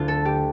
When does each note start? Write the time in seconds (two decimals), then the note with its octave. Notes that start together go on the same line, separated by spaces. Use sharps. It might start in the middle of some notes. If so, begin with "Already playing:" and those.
Already playing: D2 D3 A3 D4 F4
0.08 A4
0.25 G4